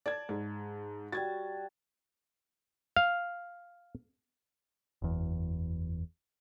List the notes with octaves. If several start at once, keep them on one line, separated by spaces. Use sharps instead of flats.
D5 A5 G#6
G#2
G3 F#4 G#6 A6
F5
F#1 E2